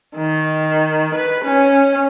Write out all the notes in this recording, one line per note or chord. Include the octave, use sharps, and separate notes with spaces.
D#3
B4
C#4